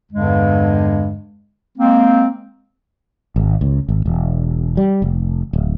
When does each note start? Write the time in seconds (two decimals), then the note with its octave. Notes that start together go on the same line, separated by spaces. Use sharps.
0.12 E2 G2 D3 G#3
1.78 G#3 A#3 C4
3.36 G#1
3.61 C#2
3.89 G#1
4.06 E1
4.77 G3
5.02 F1
5.53 D1